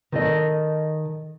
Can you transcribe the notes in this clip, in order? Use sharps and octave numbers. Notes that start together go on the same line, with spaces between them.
D#3 A4 D#5